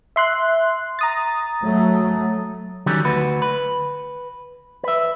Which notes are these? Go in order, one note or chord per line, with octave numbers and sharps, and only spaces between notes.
E5 C6 F#6
A#5 D#6 A6
F#3 A3
D3 D#3 F#3 G3 C#4
D2 F#4 B4
B4
B4 E5